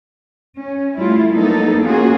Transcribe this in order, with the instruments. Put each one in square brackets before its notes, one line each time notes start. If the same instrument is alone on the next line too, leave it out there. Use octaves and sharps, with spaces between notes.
[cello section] C#4
G3 A3 E4 F4
F#3 A#3 B3 D#4 A4
A#3 C#4 F4 F#4 G#4